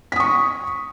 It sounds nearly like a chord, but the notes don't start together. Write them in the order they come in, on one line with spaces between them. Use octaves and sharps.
B6 D#6 C#6